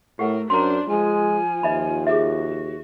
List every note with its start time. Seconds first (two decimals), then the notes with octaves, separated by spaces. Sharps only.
0.19 A2 A3 G4 A#4 F#5
0.50 F#2 D4 A#4 C5 A#5 C6
0.88 F3 G#3 F4 G#5
1.63 D#2 D#5 E5 B5
2.07 F#4 G#4 A4 E5